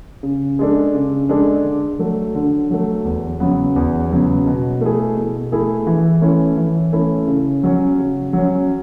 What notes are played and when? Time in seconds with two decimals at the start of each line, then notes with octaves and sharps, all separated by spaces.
0.23 C#3
0.59 G#3 D4 A4
0.94 C#3
1.29 G#3 D4 A4
1.64 D3
1.99 F#3 A3
2.35 D3
2.71 F#3 A3
3.05 E2
3.40 C#3 F#3 B3
3.76 E2
4.11 C#3 F#3 B3
4.46 B2
4.81 A3 E4 G#4
5.17 B2
5.52 A3 E4 G#4
5.87 E3
6.22 A3 C#4 E4
6.57 E3
6.93 A3 C#4 E4
7.27 C#3
7.63 F#3 C#4
7.99 C#3
8.33 F#3 C#4